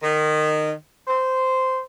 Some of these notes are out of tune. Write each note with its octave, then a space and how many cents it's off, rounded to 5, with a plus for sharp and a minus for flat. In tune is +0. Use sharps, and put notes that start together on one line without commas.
D#3 -20
C5 -10